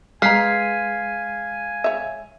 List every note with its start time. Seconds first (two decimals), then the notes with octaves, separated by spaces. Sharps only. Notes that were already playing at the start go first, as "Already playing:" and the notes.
0.22 G#3 B4 F5 G#5 A#5 B6 C7
1.84 C#5 E5